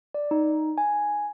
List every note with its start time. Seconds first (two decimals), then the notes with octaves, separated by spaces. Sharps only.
0.14 D5
0.31 D#4
0.78 G#5